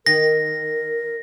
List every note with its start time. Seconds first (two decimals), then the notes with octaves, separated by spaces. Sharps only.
0.06 D#3 A#4 A#6